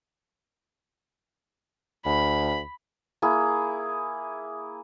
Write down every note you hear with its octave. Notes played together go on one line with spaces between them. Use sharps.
D2 B5
A#3 E4 G#4